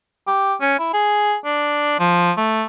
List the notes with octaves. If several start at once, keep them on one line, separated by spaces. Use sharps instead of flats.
G4
C#4
E4
G#4
D4
F3
A3